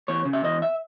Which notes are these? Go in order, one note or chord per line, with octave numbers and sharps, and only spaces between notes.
E2 C#5
C#3
E5
E2 D#5
E5